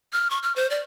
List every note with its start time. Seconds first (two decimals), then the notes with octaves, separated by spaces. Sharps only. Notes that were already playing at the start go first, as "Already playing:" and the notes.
0.13 F6
0.31 C#6
0.43 F6
0.56 C5
0.70 D5